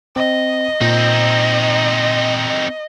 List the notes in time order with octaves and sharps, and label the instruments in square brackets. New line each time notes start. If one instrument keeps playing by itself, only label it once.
[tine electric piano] C4 [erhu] D#5
[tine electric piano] A#2 [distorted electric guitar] C4 D#4